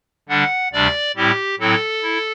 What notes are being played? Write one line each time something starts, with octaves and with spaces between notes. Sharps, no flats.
D3 G3 D4 F#5
D2 C3 G3 D4 D5
A2 G3 C4 E4 G4
A2 F#3 C4 E4 A4
E4